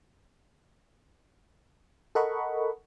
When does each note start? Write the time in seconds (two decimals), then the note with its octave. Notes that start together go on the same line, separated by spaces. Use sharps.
2.15 A4 A#4 D#5 F#5 B5 C#6